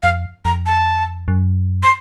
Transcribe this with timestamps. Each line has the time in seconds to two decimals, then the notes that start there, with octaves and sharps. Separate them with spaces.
0.03 F2 F5
0.45 F2 A#5
0.66 A5
1.28 F#2
1.83 C6